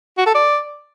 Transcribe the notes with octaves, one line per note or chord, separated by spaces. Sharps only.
F#4
A4
D5